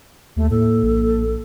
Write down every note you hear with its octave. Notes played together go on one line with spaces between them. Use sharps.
D#2 A3
A2 A#3 A4
A#1